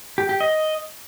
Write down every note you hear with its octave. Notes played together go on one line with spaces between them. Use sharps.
G4
G4
D#5